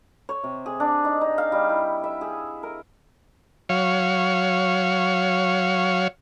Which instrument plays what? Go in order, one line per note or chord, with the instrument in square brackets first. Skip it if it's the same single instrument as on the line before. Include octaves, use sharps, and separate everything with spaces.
[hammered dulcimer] C#5
C3
G#4
D4
D#4
D#4
F5
G3
E4
E5
G#4
A#4
[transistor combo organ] F#3 C#5 F5